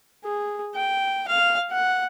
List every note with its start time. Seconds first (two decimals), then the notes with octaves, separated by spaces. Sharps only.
0.24 G#4
0.75 G5
1.28 F5
1.71 F#5